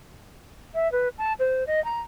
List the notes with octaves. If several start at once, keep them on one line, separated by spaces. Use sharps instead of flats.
E5
B4
A5
C5
D#5
A#5